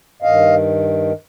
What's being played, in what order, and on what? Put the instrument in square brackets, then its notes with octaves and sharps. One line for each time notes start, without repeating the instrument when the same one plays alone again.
[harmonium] G2 D#3 D#5 F5